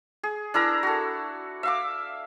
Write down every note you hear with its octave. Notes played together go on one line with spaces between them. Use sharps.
G#4
D4 E4 A#4 A#5
F#4 A4
E5 F5 D6